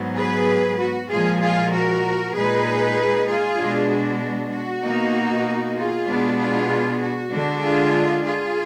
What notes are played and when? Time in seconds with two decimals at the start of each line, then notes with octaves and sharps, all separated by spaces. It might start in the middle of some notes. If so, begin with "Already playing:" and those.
Already playing: G#2 F#3 B3
0.17 G#4 B4
0.79 F#4
1.10 A#2 F3 G#3 F4 G#4
1.41 F4 G#4
1.72 F#4 A#4
2.34 A#2 G#3 D#4 G#4 B4
3.27 F4 G#4
3.58 B2 G#3 D4
3.90 F#4
4.52 F#4
4.83 B2 A#3 D#4
5.76 F4 G#4
6.07 B2 G#3 B3 D4
6.38 F4 G#4
7.00 F#4
7.31 D3 G#3 D4
7.62 F4 G#4
8.24 F4 G#4